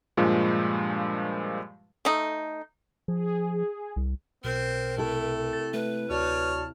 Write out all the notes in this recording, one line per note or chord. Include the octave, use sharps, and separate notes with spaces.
G2 A#2 F3 G#3
A3 D#4
F3 G#4
C2
B1 B2 C4 A#4
C3 A3 E4 A4
A6
A3 B4
D2 F#4 C#5 D5 A5 F6